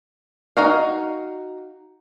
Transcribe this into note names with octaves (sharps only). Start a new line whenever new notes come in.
D#4 F#4 F5